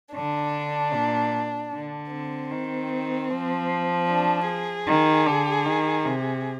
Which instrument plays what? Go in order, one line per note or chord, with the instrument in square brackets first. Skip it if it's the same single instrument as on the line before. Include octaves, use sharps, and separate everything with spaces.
[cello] D3 [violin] D4
[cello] A#2
D3
[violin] C4
[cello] D#3
F3
[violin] D4
G#4
[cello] D#3
D3
D#3
C3